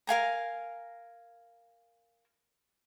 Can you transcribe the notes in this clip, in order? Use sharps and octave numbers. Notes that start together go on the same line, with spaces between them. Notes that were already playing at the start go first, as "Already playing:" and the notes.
A#4 F5 G#5 A#5